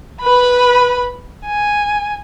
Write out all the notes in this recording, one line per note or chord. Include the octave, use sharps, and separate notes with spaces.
B4 B5
G#5